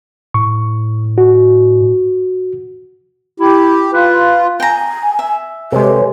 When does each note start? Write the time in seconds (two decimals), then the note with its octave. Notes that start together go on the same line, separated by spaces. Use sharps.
0.34 A2 C#6
1.18 F#4
3.40 E4 G4
3.94 F4 B4
4.60 G5 G#5 A#5
5.19 E5
5.72 C3 G#3 G4 A4 B4 C#5